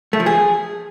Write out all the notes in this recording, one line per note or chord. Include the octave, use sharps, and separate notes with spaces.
A3
F3
G#4